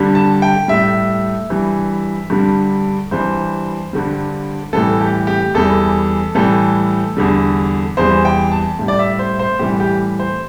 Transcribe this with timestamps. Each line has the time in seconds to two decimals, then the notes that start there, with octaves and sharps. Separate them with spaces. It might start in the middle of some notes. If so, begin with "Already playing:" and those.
Already playing: G2 D3 G3
0.15 A5
0.42 G5
0.68 A2 G3 E5
1.50 G2 E3 G3
2.30 G2 D3 G3
3.11 G2 E3 G3 C5
3.93 G2 D3 G3
4.73 A2 E3 G3 A4
5.01 G4
5.27 G4
5.54 E2 E3 G3 A4
6.35 A2 E3 G3 A4
7.17 E2 D3 G3
7.97 E2 E3 G3 C5
8.25 G5
8.52 A5
8.79 A2 G3
8.88 D5
8.99 E5
9.19 C5
9.39 C5
9.59 A2 E3 G3 G4
9.80 G4
10.19 C5